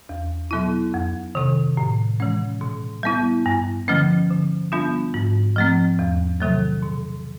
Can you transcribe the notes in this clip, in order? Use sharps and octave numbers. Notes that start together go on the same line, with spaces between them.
E2
B2 F#3 B3 E4
F2
C3 D#3
A2
E3 G#3 C#4
B2
G3 B3 E4
G2
D3 F3 A3 C#4
D3
G3 B3 D4 F4
G#2
F3 A3 C4
E2
C3 D#3 F#3 A3
B2